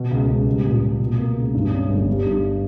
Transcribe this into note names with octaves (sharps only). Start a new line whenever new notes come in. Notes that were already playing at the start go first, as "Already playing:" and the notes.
Already playing: B2
C#2
C#2
G3
A#2
A#2
B2
A#3
C#2
G2
C#4
G1
G3
G2